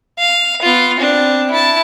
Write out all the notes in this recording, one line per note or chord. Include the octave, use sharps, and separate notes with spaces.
F5
B3 F4
C4 D4
E4 A5